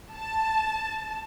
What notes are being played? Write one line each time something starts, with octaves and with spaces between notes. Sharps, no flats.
A5